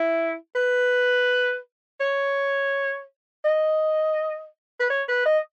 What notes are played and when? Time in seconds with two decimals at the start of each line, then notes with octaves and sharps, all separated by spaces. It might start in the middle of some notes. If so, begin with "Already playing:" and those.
Already playing: E4
0.55 B4
2.00 C#5
3.45 D#5
4.80 B4
4.90 C#5
5.08 B4
5.26 D#5